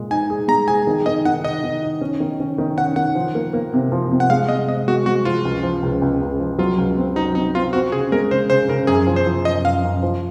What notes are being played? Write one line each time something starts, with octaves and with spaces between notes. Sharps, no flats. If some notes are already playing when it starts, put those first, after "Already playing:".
Already playing: A#2 G#3
D#4 G#5
G#4
G#3 A#5
G#4 G#5
D#3
D#3 D#5
D#3 F#5
D#4 D#5
D#3
D#4
C#4
D#3
C#4
D#3
C#4 F#5
D#3 F#5
F3
A#3
A#3
C3
F3
C3
F#5
G#3 F5
G#3 D#5
C4 D#5
G#3 F#4
G#3 F#4
F3 F4
C#2
F3
C#2
C#2
C#2
F3
F#3 F4
C#2
C4
F#3 D#4
C4 D#4
C4 F4
C4 F#4
C#3 G#4
G#3 A#4
C#3 C5
C#3 C5
C#3 A#4
F#2 G#4
F3
C5
F3
F#2 D#5
F#2 F5
F#2
F3